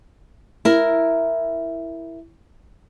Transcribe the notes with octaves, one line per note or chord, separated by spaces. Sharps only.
E4 A#4